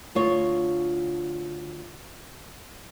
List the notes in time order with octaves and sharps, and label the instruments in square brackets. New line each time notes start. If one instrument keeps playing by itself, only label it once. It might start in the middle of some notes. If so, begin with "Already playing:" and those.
[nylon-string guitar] D2 F4 C#5